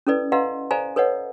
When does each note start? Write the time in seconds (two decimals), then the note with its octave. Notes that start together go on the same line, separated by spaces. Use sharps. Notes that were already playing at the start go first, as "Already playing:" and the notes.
0.07 C#4 E4 A4 B4 D5
0.32 B4 D#5 F5 F#5 A#5 C6
0.71 A4 C5 D5 F5 G#5 A#5
0.96 A4 B4 C#5 D#5 F#5